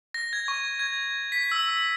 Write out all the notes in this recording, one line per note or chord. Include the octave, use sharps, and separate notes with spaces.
A#6
G#6
C#6
G#6
B6
E6
E6